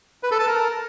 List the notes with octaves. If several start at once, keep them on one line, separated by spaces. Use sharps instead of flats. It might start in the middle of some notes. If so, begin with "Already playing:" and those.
B4
A4
A5
A#4